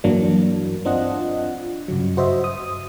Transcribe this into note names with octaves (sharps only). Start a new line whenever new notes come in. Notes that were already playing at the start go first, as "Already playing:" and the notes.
G2 E3 F#3 A#3 D4
C4 D4 F4 D#5 F#5
G2 C#3 F#3
F#4 C5 D#5 E5
D#6